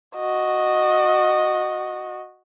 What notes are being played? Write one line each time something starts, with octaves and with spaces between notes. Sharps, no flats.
F#4 D#5